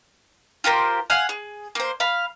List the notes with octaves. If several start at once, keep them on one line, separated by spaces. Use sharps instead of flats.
F4 G4 A#4 C5
F5 F#5 G#5 F6
G#4
A#3 C5
F5 B5